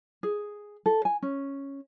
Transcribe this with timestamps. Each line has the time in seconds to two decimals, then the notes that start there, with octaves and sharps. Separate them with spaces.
0.23 G#4
0.86 A4
1.05 G#5
1.22 C#4